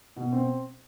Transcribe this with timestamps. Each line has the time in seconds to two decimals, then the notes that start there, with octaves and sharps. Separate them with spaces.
0.16 B2
0.33 C4